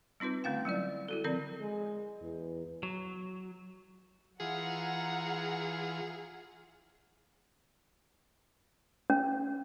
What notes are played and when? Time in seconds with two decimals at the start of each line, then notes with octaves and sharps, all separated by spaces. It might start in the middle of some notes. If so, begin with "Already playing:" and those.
0.20 G3 C4 D#4 F4 B4
0.44 D3 A3 C#4 F5 G5
0.65 F#3 G3 E4 D5
1.09 E4 F#4 A4
1.24 D3 F3 C4 A#4 D5
1.60 G#3
2.22 E2
2.83 F#3
4.40 E3 F4 G#4 F#5 A#5
9.10 C#4